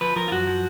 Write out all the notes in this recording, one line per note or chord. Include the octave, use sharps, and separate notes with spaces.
F3 B4
F3 A#4
F4
F#2 F#4
F3